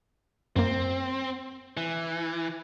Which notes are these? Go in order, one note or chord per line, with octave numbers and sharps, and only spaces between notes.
F#2 A#3 C4
E3